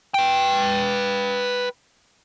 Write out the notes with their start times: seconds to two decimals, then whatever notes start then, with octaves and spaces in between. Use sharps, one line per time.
0.14 B4 G5